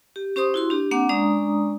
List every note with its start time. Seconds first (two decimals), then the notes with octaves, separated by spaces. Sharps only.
0.16 G4
0.36 C#4 G4 C5 C6 D#6
0.54 E4 F#4 C6
0.70 D4 G4
0.91 A#3 C4 D4 F#5 D6
1.09 G#3 C#4 D4 D5 A#5 D#6